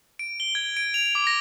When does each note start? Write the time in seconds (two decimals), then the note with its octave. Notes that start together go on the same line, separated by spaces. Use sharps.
0.19 D7
0.40 G7
0.55 G#6
0.77 D7
0.94 F7
1.15 D6
1.27 A#6